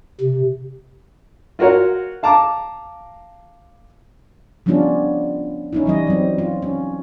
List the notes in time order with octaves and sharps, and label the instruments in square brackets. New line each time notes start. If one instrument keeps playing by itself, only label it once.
[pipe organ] C3
[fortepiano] F4 F#4 A#4 C#5 F#5
F5 A5 A#5 D6
[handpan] F3 G3 B3 C#4 D4 F4
C#4 D#4 E4
E3 G3 D#5
F#3 C4
F4
C#4